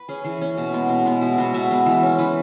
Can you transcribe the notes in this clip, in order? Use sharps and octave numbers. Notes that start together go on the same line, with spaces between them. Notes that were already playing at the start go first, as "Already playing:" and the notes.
Already playing: B4
C#4 G#4
E3 G#4
C#4
B2
G#3 B3
B2
G#3 B3
B2 E4
G#3 B3 F#4
B2 E5
G#3 B3
E3
C#4
E3 B4